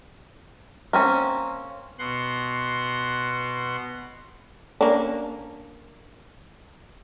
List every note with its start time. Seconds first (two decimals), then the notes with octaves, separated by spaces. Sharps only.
0.93 A#3 C4 C#4
1.99 B2 F#5 C6
4.81 A#3 C#4 D4